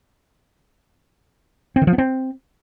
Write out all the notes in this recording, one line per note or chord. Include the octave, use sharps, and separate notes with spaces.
C4
D#3
F3
B3
C4